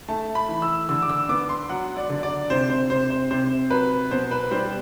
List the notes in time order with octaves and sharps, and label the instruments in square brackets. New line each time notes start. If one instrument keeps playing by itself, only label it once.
[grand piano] A3 A5
B5
E3
E6
D3 E6
D6
E6
B3 D6
C6
F#3 F#5
D5
D3
D5
C3 C5
C5
C3 C5
C5
C3 C5
F#3 B4
B2 C5
B4
G3 C5